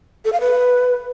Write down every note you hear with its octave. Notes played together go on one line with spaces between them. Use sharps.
A4
F5
B4